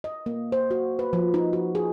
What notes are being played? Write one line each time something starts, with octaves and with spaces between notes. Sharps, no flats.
D#5
A#3
C5
F#4
B4
F3
D#4
F#4
G#4